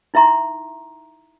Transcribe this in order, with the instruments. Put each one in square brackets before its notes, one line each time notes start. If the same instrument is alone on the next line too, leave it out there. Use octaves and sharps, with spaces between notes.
[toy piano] D#4 E4 E5 A#5 C6